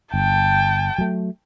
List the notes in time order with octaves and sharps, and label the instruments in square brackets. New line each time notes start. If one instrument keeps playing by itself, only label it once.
[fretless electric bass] G1 [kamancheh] G5 A5
[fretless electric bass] F#3 A3